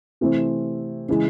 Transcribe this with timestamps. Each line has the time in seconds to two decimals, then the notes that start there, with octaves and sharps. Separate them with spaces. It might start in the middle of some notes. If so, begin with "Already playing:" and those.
0.21 C3 E3 A3 C4
1.09 C#3 E3 G#3